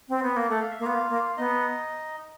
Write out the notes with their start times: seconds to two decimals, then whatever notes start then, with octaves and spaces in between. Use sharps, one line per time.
0.09 C4
0.23 B3
0.36 A#3
0.49 A3 F#5
0.61 F5
0.71 E5
0.79 A#3
0.82 B3 F4 F5
0.95 A#3
1.08 A#3
1.37 B3 D#4 D#5